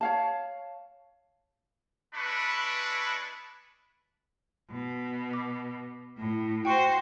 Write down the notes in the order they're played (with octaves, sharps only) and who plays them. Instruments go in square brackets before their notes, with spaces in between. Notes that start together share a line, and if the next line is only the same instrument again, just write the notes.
[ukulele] C#5 F5 A5
[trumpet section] G#3 D4 E4 B4 B5 C#6
[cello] B2
[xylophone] D6
[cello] A2
[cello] F#4 C5 [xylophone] G5 C#6